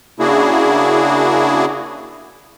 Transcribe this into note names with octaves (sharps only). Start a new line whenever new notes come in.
C#3 A#3 D4 E4 F#4 G#4